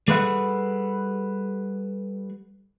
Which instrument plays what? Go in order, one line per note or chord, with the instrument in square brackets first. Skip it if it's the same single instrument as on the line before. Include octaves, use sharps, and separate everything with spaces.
[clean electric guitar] G3 G#4 A4 B4 E5 F#5